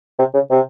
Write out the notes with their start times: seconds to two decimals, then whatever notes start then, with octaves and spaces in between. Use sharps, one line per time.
0.19 C3
0.34 C#3
0.51 C3